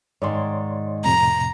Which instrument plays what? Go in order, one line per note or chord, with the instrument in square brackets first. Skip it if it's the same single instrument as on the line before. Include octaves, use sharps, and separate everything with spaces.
[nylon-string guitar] G#2 D#3 [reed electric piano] C#5 D5 C6
[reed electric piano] F2 A2 C3 [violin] A#5